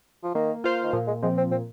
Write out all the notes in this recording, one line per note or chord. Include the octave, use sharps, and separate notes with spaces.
F3
D#3 A#3
F4 C5 F5
D#3
A#2 F3
G#3
F3 G#3 C4
C4
A#2 C4